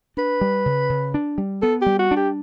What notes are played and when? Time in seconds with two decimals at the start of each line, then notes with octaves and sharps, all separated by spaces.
0.17 D4 B4
0.41 G3
0.66 C#3
0.90 C#3
1.14 D4
1.38 G3
1.62 B3 A4
1.81 G4
1.86 G3
1.99 F#4
2.11 D4
2.16 G4